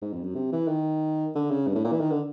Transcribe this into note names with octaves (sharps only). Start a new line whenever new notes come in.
G#2
F2
F#2
C3
E3
D#3
D3
C#3
G2
A2
A#2
E3
D#3
D3